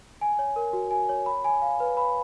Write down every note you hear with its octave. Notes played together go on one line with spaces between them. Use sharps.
G#5
C#5
A#4
F#4
G#5
C#5
B5
G#5
F5
B4
B5